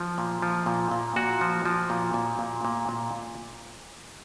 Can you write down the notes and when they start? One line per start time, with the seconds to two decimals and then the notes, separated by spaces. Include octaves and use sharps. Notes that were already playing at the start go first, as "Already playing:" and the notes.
Already playing: F3
0.18 A#2
0.42 F3
0.66 A#2
0.91 A#2
1.16 A#2 F#4
1.41 F3
1.66 F3
1.90 A#2
2.14 A#2
2.39 A#2
2.65 A#2
2.89 A#2